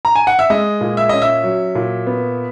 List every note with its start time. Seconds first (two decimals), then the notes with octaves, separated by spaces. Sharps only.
0.05 A#5
0.15 G#5
0.27 F#5
0.39 E5
0.50 G#3 D#5
0.81 A#2
0.97 E5
1.09 C#4 D#5
1.22 E5
1.44 F#3
1.75 A#2
2.07 B3